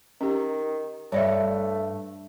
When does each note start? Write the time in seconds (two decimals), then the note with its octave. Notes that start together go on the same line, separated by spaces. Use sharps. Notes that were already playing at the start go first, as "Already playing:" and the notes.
0.21 D#3 C#4 G4
1.12 G2 A3 C#5 D5 E5